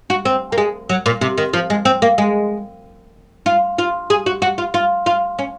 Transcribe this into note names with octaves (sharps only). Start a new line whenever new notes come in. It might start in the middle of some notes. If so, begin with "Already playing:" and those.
F#4
C4
A#3
G#3
F#3
A#2
C3
D#3
F3
G#3
C4
A#3
G#3
F4
F4
G#4
F#4
F#4
F4
F4
F4
C#4